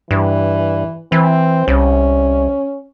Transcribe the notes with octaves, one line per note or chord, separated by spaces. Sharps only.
G2 E3
E3 C4
C2 C#4